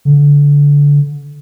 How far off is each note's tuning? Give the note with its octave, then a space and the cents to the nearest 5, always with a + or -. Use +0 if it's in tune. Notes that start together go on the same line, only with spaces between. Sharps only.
D3 -25